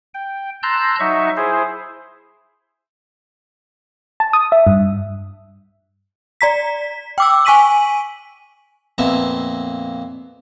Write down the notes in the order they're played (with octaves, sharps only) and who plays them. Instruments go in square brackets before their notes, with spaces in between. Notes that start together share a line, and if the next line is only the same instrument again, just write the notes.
[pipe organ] G5
A5 A#5 C6 E6 F#6 G6
F#3 D#4 E5 C#6
E4 G#4 C5
[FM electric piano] A5
D#6
E5
G2
[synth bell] D5 A#5 B6
G5 D6 E6
G#5 C#6 B6 D#7 F#7
[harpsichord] F2 A#2 A#3 B3 E4 A5